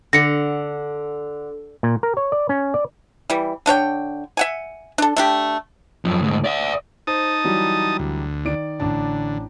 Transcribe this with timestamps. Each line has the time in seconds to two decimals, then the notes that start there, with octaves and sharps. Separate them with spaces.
0.13 D3 A#6 C#7
1.83 A#2
2.03 A#4
2.17 C#5
2.32 D5
2.49 C#4
2.74 D5
3.30 E3 G3
3.66 D3 D4 C#5 G5
4.37 E5 F#5 G#5
4.98 D4 A4
5.17 A3 D4 G4
6.05 F#2 F3
6.23 D2 G#2
6.44 D5 E5
7.07 D#4 C5 A5 D#6
7.44 E3 F#3 G3
7.99 D2
8.45 D#3 D5 D7
8.80 A1 D3 D4 A5